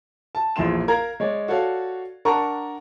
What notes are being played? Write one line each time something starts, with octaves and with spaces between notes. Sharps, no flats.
A5
A#1 E2 A2 C6 E7
A#4 F5 A#5 G#6
G#3 C#5 D5
F#4 A4 C#5 D5 F5
D4 A#4 F#5 A5 A#5 C#6